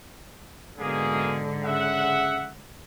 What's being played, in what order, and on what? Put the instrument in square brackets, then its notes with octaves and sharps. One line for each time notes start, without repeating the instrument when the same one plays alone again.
[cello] G#2 D3 [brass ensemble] B2 A#3 G#4
[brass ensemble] C#3 E5 F#5